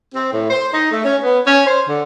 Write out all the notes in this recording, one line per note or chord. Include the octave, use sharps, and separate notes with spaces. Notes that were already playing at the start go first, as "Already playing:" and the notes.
C4
A2
C5
D#4
A3
C#4
B3
C#4
C5
D3